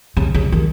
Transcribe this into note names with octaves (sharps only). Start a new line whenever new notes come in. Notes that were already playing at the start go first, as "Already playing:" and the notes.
C#3
C#3
D#3